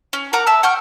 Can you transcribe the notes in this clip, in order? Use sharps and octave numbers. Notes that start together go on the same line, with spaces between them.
C#4
A#4 F#5 A#5 D6
E5 A5 E6
F#5 G5 C#6 F6